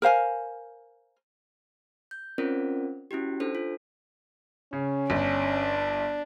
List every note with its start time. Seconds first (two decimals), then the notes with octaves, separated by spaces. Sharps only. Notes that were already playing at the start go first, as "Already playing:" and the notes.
0.02 A#4 C5 F5 G#5
2.11 G6
2.38 C4 C#4 F4 A#4 C5 D5
3.11 C#4 E4 F#4 G4
3.40 D4 A4 C5
3.55 F4
4.73 C#3 C#4
5.10 G1 D4